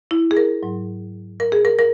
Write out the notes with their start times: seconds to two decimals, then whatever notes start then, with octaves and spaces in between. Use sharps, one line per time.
0.11 E4
0.31 G#4
0.37 A#4
0.63 G#2 F#3
1.40 A#4
1.52 G#4
1.65 A#4
1.79 A#4